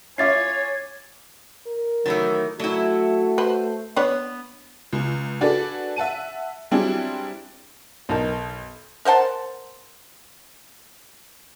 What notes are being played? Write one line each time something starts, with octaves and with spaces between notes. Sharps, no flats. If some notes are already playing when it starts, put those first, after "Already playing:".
C#4 E4 F4 C#5 G#5 D6 A6 C7
A#4
D#3 E3 F#3 A3
F#3 A3 E4 F#4
B4 C5
B3 D4 B4 C#5
C#2
D4 F#4 G#4 A4 B4 D5
E5 F#5 A5 D#7
F#3 G3 C4 D4 E4 G#4
B1 D#4 A#4 A5
A#4 C5 F#5 A5